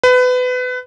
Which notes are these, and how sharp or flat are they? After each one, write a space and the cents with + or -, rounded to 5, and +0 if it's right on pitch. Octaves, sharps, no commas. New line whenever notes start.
B4 +25